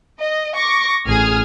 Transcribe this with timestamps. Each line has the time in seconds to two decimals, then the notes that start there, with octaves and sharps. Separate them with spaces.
0.19 D#5
0.56 C#6 D6 A#6
1.07 A1 G#4 D#6 F6 G#6